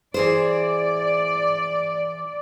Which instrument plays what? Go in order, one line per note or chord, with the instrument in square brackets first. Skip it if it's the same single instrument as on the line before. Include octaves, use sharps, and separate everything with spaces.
[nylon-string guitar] E3 G#4 C5 [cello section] D5